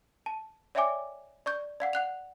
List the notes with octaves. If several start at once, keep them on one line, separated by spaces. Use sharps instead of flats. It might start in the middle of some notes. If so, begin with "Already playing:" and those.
A5
C#5 D5 E5 G5 G#5 D6
D5 C#6 G6
D5 F5 F#5
F#5 F#6 F7